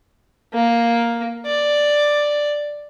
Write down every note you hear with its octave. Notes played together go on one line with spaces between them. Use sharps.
A#3
D5